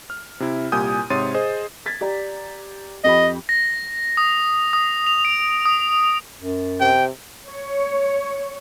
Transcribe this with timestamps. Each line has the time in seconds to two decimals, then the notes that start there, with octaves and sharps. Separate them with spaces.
0.10 F6
0.40 C3 E4
0.72 C2 A#2 G4 G#5 D#6 G6
1.10 G#2 C3 C#5 C6 A6 D#7
1.34 G#4 C5 D#5
1.86 G#6 A6 B6
2.01 G4 D5 A#5
3.04 F2 G4 D#5 B5
3.49 A#6
4.17 D#6
4.73 D#6
5.07 F7
5.25 D7
5.66 D#6
6.37 F#2
6.80 C3 G5
7.47 C#5